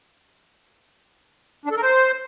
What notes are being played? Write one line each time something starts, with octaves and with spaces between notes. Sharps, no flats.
D4
A4
A#4
C5